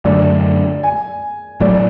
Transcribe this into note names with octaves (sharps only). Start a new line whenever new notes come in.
F#2 D3 A3 D5
G#5
A1 A2 F#3 A3 D5